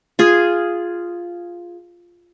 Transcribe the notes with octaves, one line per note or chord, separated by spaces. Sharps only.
F4 G#4